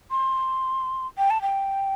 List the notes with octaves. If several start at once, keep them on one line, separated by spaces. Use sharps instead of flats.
C6
G5
A5
G5